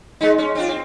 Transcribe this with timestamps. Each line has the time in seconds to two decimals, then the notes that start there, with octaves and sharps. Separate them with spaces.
0.21 G#3 D#4
0.38 C#4
0.55 C4 D4 F4
0.68 C4